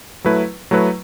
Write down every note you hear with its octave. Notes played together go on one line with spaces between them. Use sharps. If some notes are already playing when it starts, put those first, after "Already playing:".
F#3 A3 E4 B4
F#3 A3 E4 B4